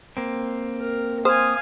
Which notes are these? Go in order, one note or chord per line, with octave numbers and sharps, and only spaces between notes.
A#3 C4
A#4
C5 F5 G#5 D#6